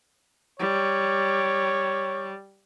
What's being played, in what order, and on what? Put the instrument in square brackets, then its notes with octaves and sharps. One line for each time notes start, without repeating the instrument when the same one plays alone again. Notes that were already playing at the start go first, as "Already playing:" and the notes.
[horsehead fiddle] G3 [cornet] C#5